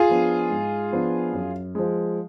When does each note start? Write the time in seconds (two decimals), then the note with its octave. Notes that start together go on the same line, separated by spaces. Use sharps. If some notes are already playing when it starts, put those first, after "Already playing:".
Already playing: F4 G#4
0.09 F3 B3 D4
0.51 G#2
0.92 F3 B3 D4
1.33 F#2
1.75 F3 G#3